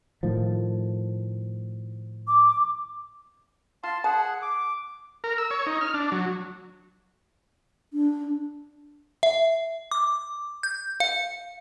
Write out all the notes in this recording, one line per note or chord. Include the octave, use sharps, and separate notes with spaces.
A2 D#3 F3
D6
F4 A5 C6
G#4 F#5 A5
D6
A#4
E6
C#5
D#4
F6
D4
F#3
D4
E5
D6
G6
F5